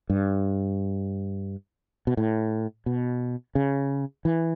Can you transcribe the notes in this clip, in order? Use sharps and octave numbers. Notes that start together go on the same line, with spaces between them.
G2
B2
A2
B2
C#3
E3